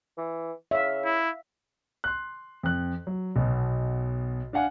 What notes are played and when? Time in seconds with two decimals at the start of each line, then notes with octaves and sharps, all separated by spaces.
0.17 E3
0.71 C#3 E5 F5
1.05 E4
2.04 C6 F#6
2.63 F2 F#6
3.07 F#3
3.36 B1 B2
4.53 D4 F5 F#5 G#5